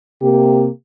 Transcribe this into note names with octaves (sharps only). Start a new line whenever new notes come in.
C3 A#3 G4